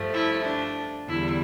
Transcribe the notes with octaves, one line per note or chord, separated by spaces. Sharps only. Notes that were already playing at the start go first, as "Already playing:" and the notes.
Already playing: G2 F3 A3
E4
D4
E2 D3 G3 E4